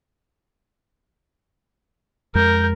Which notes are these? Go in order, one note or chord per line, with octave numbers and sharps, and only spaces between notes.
F2 G#3 A#4 G6